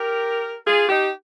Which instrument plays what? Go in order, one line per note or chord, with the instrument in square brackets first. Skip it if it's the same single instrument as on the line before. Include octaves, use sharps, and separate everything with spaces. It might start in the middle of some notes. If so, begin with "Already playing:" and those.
Already playing: [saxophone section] G4 A#4
F4 G#4
D#4 G4